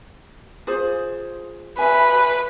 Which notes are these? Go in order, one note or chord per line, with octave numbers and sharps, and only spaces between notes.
F4 G#4 C5
B4 E5 G#5